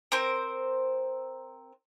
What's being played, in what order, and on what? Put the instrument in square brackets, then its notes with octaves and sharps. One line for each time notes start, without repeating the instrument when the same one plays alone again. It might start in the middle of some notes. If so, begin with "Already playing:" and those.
[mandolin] C4 A#4 C5